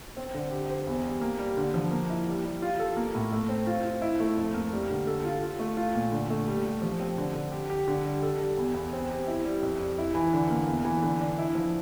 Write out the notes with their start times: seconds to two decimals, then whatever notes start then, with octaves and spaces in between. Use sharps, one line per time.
0.17 C4
0.34 D3
0.51 G4
0.70 C5
0.87 E2
1.04 G3
1.21 A#3
1.39 G3
1.57 D3
1.74 F3
1.91 A#3
2.10 E4
2.27 G3
2.45 G3
2.62 F4
2.80 A4
2.97 A#3
3.15 A2
3.33 A3
3.49 C4
3.67 F4
3.85 F4
4.02 E4
4.20 A3
4.37 F2
4.54 A#3
4.73 G3
4.90 D3
5.07 A4
5.24 F4
5.43 F4
5.59 A3
5.77 F4
5.95 A#2
6.12 D3
6.30 A3
6.48 G3
6.64 G3
6.82 F3
7.00 C4
7.18 D3
7.35 D3
7.52 G4
7.70 G4
7.88 D3
8.06 G3
8.23 A4
8.41 G3
8.57 E2
8.75 E2
8.93 C4
9.11 G4
9.27 E4
9.45 G3
9.62 F2
9.80 G3
9.98 E4
10.15 E3
10.33 D3
10.50 A#3
10.67 E2
10.85 E3
11.03 D3
11.21 D4
11.38 E4
11.55 F3